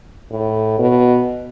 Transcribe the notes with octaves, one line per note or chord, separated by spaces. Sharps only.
A2
B2